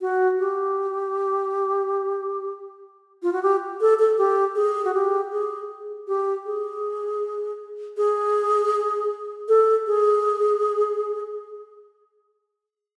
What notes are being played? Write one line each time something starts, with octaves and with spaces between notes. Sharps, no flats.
F#4
G4
F4
F#4
G4
A4
A4
G4
G#4
F#4
G4
G#4
G4
G#4
G#4
A4
G#4